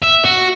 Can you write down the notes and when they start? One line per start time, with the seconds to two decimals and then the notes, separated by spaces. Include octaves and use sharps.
0.04 E5
0.25 F#4